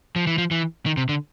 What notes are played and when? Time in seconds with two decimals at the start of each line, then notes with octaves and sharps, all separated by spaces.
0.16 F3
0.27 E3
0.38 F3
0.51 E3
0.86 D#3
0.97 C3
1.09 D3